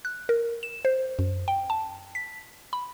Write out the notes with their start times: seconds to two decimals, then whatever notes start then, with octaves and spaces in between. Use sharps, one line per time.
0.05 F#6
0.29 A#4
0.63 E7
0.85 C5
1.19 F#2
1.48 G5
1.70 A5
2.15 B6
2.73 B5